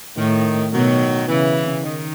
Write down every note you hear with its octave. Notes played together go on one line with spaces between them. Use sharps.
A2 D#3
B2 D#3 F#3
C#3 E3
D#3